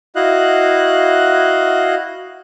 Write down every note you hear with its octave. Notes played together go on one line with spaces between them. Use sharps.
E4 F#4 D#5 F5 F#6